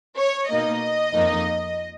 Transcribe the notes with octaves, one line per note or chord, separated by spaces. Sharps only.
C#5
B2 A#3 D#4 D#5
F2 F3 A#3 D#4